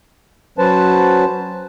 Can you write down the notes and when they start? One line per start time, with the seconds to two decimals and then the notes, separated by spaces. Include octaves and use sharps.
0.58 F#3 C#4 B4 C5 A5